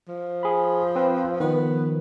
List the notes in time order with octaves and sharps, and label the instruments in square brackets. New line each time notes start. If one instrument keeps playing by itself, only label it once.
[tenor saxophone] F3
[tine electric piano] G#4 B5
C4 B4
[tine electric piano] D#3 F3 [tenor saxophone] B3